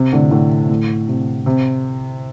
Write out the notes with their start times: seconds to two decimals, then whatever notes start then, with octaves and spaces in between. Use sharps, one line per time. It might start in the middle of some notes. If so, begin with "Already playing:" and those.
Already playing: C3
0.13 A2 D3
0.31 A2 D3
0.69 A2
1.08 C3
1.46 C3